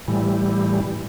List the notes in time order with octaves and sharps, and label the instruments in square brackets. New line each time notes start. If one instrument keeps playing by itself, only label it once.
[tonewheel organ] A2 E3 G3